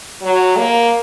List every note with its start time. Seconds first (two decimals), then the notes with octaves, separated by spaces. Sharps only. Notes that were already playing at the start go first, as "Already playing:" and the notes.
0.22 F#3
0.57 A#3